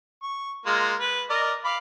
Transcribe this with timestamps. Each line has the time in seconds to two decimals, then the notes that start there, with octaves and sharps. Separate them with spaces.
0.23 C#6
0.66 G#3 A#3 F4
1.00 B4
1.30 A#4 D5 D#5
1.65 F5 B5 D6